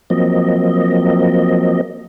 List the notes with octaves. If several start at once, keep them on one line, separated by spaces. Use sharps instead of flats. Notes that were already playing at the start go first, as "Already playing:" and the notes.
F3 F#3 A#3 C4 D#5